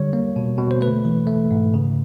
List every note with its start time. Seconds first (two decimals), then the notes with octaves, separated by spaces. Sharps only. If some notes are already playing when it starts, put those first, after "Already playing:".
Already playing: D3 G3 C#5
0.13 A#3
0.36 B2
0.58 B2
0.71 C5
0.81 A3 B4
1.05 E3
1.27 A3
1.51 G#2
1.74 C#3